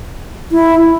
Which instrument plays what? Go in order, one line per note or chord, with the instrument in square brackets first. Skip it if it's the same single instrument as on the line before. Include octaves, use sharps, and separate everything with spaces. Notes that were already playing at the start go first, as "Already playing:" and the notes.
[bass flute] E4